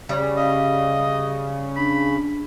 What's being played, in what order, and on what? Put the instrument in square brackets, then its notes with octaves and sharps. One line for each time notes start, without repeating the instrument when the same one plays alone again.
[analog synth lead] C#3 [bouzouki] G3
[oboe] D#5 [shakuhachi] F5
[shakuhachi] D4 [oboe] B5